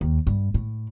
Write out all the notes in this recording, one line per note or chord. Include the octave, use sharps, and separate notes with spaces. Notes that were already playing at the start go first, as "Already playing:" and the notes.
D#2
G2
A2